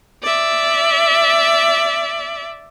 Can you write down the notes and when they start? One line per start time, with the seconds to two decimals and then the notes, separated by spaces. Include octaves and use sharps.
0.23 D5 E5